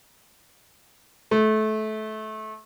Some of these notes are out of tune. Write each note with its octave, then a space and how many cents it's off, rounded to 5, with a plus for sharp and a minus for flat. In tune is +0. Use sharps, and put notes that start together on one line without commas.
A3 -25